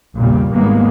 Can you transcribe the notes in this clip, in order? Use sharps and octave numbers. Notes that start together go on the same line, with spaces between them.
A#1 E2 A#2 C#3 G3
G#1 G#2 G3 G#3 A#3 B3